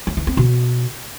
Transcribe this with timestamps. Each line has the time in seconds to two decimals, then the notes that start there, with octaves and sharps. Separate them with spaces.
0.07 F#3
0.17 E3
0.27 C4
0.37 B2